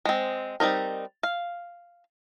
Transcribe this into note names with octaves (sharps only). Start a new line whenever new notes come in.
G#3 C4
G3 C4 D#4 A#4
F5